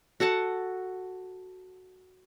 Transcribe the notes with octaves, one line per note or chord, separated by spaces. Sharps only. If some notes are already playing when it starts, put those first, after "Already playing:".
F#4 A4 F#5 A5